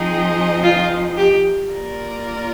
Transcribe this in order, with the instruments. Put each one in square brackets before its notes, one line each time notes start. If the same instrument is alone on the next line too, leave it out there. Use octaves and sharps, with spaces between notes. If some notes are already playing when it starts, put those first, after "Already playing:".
Already playing: [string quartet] F3 C4 D#4 G#4 D#5
[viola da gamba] F4
G4
[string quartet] A#3 F4 A#4 D5